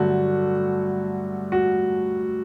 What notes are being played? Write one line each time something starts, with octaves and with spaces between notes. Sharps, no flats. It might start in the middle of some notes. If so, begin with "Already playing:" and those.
Already playing: G2 D3 F#3 A3 F#4
F#4